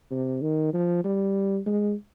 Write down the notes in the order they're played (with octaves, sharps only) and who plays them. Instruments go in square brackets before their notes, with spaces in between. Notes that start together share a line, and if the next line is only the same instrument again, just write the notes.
[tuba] C3
D#3
F3
G3
G#3